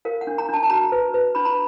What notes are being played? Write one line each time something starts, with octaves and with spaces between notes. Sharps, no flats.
A#4 F5
F#5
D4
A#5
D4 A5
A5
F#4 A#5
B4
B4
D4 B5
A#5